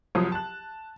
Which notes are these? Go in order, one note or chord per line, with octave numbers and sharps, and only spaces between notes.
C2 F3 F#3 D#6
A5 F#6